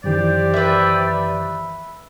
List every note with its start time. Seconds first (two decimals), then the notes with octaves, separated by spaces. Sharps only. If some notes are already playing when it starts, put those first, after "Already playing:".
0.04 F#2 D#3 E3 G4 C5 D5
0.54 B4 E5